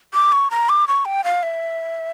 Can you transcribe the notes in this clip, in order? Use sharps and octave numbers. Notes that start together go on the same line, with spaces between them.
D6
C#6
A#5
D6
C#6
G5
F5
E5